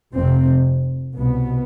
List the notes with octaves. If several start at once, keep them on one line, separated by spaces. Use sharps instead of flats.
F1 F2 C3 C4
C2 B2 B3